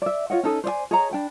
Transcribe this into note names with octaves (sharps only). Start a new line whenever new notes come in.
D5 E5
F4 C#5 D#5 F#5
C#4 D#4 A4 D#5
C5 D5 D#5 G#5
G#4 C#5 D#5 A#5
D4 G5 B5